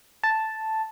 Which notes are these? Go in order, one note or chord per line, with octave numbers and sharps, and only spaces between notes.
A5